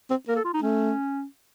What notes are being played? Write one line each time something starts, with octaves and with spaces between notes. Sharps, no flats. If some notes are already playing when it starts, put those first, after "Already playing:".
C4
A#3 A#4
A4
F4
D#4
A3 C#4